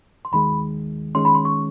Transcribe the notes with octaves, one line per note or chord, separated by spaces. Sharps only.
C6
D#2 D#3 G#3 B5
D#3 G#3 C#4 C6
B5
C6
C#6